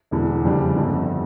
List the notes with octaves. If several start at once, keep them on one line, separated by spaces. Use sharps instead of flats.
E1 E2 D3
F2 C#3 G3 D4
G1 F2 D3